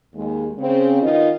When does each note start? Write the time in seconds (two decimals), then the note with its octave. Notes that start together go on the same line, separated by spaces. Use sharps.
0.14 D#2 G#3
0.58 C#3 C4
1.01 D#3 B3 D#4 F4 D#5